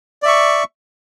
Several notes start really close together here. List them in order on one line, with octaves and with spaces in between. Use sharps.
D5 E5 C#6